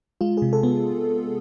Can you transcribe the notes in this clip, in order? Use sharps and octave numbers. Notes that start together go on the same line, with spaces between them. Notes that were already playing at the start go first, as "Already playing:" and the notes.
G#3 F4
C3 G#4
A4
B3